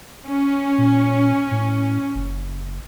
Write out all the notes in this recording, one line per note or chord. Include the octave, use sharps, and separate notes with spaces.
C#4
A#2
A2
F#1